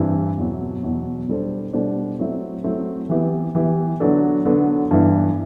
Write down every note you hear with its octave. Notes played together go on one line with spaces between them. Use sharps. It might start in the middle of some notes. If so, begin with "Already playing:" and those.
Already playing: G2 E3 G3 C4
E2 B2 F#3
E2 B2 F#3
B2 G3 D4 A4 C5
B2 G3 D4 A4 C5
F#3 A3 C4 E4
F#3 A3 C4 E4
E3 B3 E4 G4
E3 B3 E4 G4
D3 F#3 B3 D4 A4
D3 F#3 B3 D4 A4
G2 E3 B3 E4